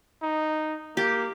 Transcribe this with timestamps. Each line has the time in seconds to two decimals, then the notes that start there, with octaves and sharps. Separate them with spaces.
0.22 D#4
0.97 A#3 G4